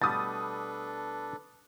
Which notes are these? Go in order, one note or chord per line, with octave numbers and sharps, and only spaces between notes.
B2 G3 A3 D4 A4 B4 D#6 A6